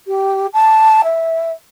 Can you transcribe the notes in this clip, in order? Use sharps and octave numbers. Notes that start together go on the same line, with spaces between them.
G4
A5
E5